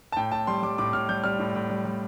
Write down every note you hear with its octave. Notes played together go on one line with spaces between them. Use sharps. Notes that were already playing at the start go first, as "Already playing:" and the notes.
A5
A2 G5
A2 A5
G3 C6
G3 D6
A2 D6
A2 F6
G3 G6
G3 F6
A2
A2
G3
G3